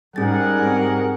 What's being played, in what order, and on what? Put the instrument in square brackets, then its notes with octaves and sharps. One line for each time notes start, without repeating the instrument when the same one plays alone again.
[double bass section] G#2 [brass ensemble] G3 F#5 [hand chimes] C#4 A6 [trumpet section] G#4 A#4
[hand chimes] C4